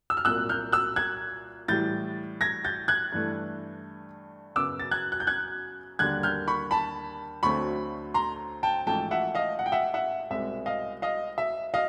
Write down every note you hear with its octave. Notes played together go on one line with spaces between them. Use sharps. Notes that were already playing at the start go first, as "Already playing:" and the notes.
E6
F6
C2 A#2 F#3 A#3 E6 F#6
F6 G6
E6 F#6
F#6 G#6
A2 E3 G3 G6 A6
G#6 A#6
G6 A6
F#6 G#6
G2 E3 A3
F#2 C#3 F#3 B3 D6 E6
A6
F#6 G#6
F#6
G6
F#6 G#6
D#2 D3 G3 A#3 F#6 G#6
F6 G6
B5 C#6
A5 B5
D2 D3 F#3 A3 C4 B5 C#6
A#5 C6
G5 A5
A1 G#2 F3 A3 G5 A5
E5 F#5
D#5 F5
F#5
G5
E5 F#5
E5 F#5
C2 B2 G#3 C4 E5
D#5 F5
D#5 F5
E5
D#5 F5